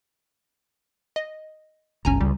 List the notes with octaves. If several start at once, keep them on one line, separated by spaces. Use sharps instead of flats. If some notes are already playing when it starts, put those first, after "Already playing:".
D#5
G1 C#2 C#4 G#5 A#5
C#2 G3